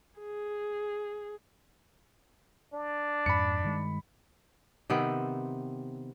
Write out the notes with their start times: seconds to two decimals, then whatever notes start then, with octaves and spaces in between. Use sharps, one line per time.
0.19 G#4
2.74 D4
3.26 F2 G#2 B5 C#7
3.63 G2 D#3 G#3
4.90 C3 D#3 B3 C4